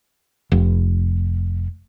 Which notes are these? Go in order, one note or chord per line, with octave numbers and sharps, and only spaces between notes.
F1